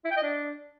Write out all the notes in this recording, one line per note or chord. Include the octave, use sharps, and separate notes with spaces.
E4
G5
D#5
D4